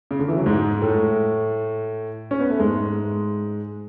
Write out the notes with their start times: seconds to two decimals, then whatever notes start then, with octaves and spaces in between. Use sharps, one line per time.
0.11 C#3
0.19 D3
0.28 E3
0.37 F#3
0.46 G#2 G#3
0.82 A2 A3
2.31 C#4
2.40 B3
2.50 A3
2.60 G#2 G#3